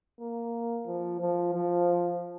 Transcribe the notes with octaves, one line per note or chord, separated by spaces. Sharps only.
A#3
F3
F3
F3